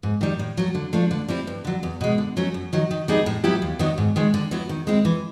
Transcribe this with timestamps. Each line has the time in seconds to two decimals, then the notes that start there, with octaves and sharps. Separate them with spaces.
0.03 G#2
0.21 D#3 G3
0.39 A2
0.57 F#3 A3
0.75 D3
0.93 F3 A3 D4
1.11 D3
1.28 G3 C4 E4
1.47 G2
1.65 D3 F#3
1.83 E2
2.01 B2 G#3
2.18 D3
2.37 F#3 A3 C#4
2.54 F#2
2.73 D#3 F#3
2.91 D#3
3.08 G3 B3 D#4 G#4
3.26 A2
3.44 F#3 B3 E4 G4
3.62 D#2
3.79 D#3 F#3 B3 D4
3.98 G#2
4.16 D#3 G#3
4.34 D3
4.51 F#3 B3 E4
4.69 D#3
4.87 G#3 C4 E4
5.05 E3